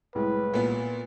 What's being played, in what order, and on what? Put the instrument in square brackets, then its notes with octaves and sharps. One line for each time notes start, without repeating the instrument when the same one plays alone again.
[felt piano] C2 A2 G#3 [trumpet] B4
[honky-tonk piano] A#2 B3